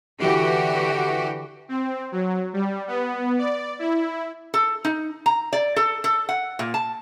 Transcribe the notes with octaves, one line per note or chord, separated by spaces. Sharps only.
D3 E3 F#4 G4
C4
F#3
G3
B3
D5
E4
A4
D#4
A#5
D5
A4
A4
F#5
A#2
A5